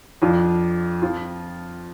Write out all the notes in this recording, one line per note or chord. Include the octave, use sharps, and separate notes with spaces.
F2 F3 D4 F4
F3 C4 F4